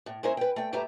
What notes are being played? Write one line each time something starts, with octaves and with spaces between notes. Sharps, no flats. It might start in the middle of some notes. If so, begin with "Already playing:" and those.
A2
G#3 C#4 E4 A#4 C5
B4 G5
A3 G5
G2 A3 G4 B4 E5 A#5